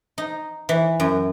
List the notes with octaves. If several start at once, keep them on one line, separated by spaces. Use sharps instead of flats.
D#4
E3
F#2